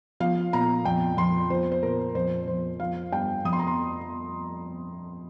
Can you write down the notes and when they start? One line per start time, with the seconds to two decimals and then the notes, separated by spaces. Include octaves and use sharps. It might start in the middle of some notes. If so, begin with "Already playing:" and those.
0.20 F3 F5
0.53 A#2 A#5
0.85 F2 G5
1.17 F2 C6
1.50 F3 C5
1.72 C5
1.83 A#2 A#4
2.15 F2 C5
2.48 F2 C5
2.80 F3 F5
3.12 G2 G5
3.45 F2 D#6
3.53 C6
3.59 A#5
3.67 C6